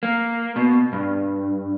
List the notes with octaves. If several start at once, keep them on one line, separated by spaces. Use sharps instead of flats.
A#3
B2
G2